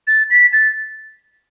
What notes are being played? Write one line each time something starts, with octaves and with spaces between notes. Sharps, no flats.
A6
B6
A6